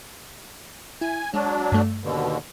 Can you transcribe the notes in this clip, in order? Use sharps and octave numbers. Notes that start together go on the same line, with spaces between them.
E4 G#5
F#3 G#3 D4
G2 A3
D#2 B2 D3